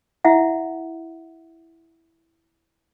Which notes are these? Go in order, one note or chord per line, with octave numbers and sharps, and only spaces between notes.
E4 E5 F#5